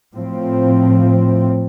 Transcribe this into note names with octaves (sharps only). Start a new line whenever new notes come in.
A2 F3 C4